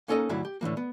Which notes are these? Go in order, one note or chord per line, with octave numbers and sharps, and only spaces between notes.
A#3 C#4 D#4 A4 A#4 D#5
D2 G2 C3 F#3 E4 B5
G4
A2 D3 E3 A#3
B3